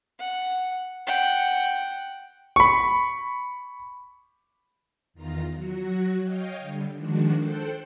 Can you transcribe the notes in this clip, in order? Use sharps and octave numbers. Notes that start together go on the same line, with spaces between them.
F#5
F#5 G5
B5 C#6
E2 D#3 F4 A#5
F#3 F#4
C#5 D#5 F5 G5
D3 G3
D#3 F3 G#3 D4 F#4
A4 C5 G5 F#6 C#7